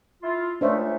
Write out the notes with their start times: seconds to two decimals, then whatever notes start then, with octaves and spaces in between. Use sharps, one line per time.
0.22 E4 F4
0.61 C#2 A3 D4 C5 E5